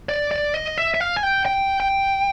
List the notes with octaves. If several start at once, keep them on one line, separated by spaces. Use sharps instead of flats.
D5
D5
D#5
E5
E5
F5
G#5
G5
G5
G5